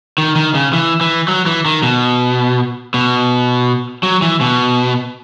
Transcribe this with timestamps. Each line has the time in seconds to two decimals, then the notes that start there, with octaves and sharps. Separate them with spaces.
0.18 D#3
0.36 D#3
0.55 C#3
0.73 E3
1.01 E3
1.28 F#3
1.46 E3
1.66 D#3
1.83 B2
2.94 B2
4.03 F#3
4.22 E3
4.41 B2